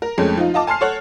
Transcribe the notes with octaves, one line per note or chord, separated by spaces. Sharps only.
A#4
F2 G#3 A3 C#4
F3 D#4 F4
F4 D#5 A5 D6
G#5 A5 C6 F6 C7
A4 C#5 F#5